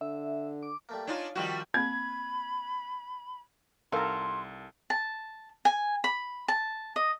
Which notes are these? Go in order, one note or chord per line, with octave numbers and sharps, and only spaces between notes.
D3 E5
D6
G3 A3 A#3
D4 D#4 F4 C#5 D5 G#5
D#3 F3 G3 C4 F#4 F#5
A#3 C4 B5 G#6
C2 D#3 A4 A#4 F5 A5 C6
A5
G#5
B5
A5
D#5